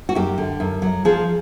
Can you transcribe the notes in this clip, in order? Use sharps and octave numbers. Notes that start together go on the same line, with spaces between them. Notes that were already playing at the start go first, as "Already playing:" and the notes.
F#4
F#2 G4
D3
F#2
F#3
F3 G#4